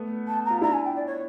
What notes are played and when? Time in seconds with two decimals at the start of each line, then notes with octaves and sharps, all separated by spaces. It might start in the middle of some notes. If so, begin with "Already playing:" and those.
Already playing: A3 B3
0.27 A5
0.45 A#5
0.50 F4
0.62 D4 E4 A#5
0.73 G#5
0.85 G5
0.96 D5
1.06 C#5